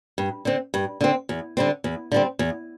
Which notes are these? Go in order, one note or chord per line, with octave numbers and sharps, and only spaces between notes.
G2
D3 C4
G2
D3 C4
E2
D3 G3 C4
E2
D3 G3 C4
E2